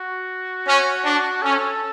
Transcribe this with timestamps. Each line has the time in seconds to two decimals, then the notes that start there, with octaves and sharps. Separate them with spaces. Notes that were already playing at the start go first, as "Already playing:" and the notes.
Already playing: F#4
0.66 C#4
1.04 D4
1.42 C#4 A4